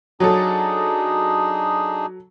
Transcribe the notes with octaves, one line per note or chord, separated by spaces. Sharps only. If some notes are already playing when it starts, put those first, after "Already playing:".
F#3 D4 D#4 G#4 A4